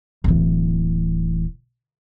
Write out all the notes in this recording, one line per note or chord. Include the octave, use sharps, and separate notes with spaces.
D1 E3